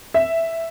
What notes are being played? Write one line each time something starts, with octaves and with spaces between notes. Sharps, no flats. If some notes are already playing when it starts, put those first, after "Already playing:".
E5